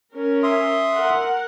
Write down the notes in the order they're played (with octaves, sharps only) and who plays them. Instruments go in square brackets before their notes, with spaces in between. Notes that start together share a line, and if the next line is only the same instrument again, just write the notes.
[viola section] C#4 A#4
[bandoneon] E5 C6 D#6
[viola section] A#4 F#5